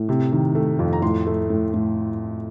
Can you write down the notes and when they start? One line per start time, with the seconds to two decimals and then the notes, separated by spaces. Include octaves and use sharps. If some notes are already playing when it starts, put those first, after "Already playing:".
Already playing: A2
0.09 C3
0.32 D#3
0.55 A3
0.79 F2
0.93 A#5
1.02 A2 C6
1.27 A3
1.50 A2
1.74 A2